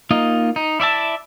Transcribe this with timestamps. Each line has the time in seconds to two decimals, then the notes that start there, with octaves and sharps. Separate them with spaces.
0.11 A#3 D#4 F4 D#5
0.56 D#4
0.80 E4 D5 E5 A5